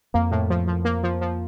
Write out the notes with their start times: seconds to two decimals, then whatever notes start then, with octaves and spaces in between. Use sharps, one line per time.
0.14 F2 A#3
0.31 A2
0.50 F3
0.68 F3
0.85 A#3
1.03 F3
1.21 F3